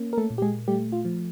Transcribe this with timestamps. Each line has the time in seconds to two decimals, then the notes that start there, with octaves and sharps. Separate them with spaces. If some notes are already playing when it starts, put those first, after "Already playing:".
Already playing: A#3 C#4
0.13 A#4
0.17 A3 A4
0.30 A#2
0.38 G4
0.42 G#3 G#4
0.68 G3 A3 G4
0.92 F4
1.05 F3